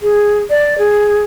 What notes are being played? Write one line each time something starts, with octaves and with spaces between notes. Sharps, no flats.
G#4
D5
G#4